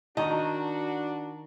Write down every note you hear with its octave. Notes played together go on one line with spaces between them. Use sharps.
D#3 D4 F#4 D#5 A5 A#5 C#6